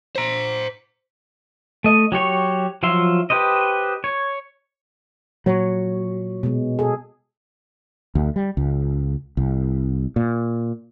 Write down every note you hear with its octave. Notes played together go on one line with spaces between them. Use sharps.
C5 A#5
A3 D#5
F#3 G4 C#5 C#6
F3 F#3 F4 E5 C6
G4 B4 C5 D#5
C#5
A#2 F#3 C#5
B2 G#3
G#4 A4
D2
G3
C#2
C2
A#2